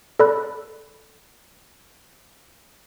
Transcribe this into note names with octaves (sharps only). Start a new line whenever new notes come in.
A4 D5 B5 F#6